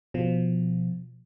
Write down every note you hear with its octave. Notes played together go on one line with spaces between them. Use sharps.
B2 F3